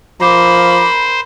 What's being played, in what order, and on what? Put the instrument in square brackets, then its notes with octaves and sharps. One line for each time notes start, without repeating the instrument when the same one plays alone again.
[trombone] F3 [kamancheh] A#4 B5 [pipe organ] C5 [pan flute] D6